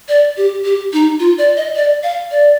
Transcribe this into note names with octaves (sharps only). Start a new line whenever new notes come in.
D5
G4
G4
D#4
F4
D5
D#5
D5
F5
D5